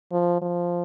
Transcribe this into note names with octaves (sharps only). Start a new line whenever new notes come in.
F3
F3